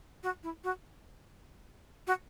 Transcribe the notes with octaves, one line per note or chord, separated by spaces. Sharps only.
F#4
E4
F#4
F#4